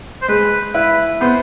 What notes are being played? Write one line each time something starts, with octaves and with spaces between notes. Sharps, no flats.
C5
G#3 B4
E4 B4
B3 C5